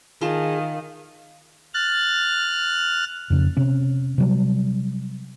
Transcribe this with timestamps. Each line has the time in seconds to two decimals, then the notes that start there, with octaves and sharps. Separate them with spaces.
0.21 D#3 F4 G#4 F5 A5
1.74 F6 F#6 A6
3.30 F2 C#3
3.57 C3 C#4
4.18 C3 F#3 G3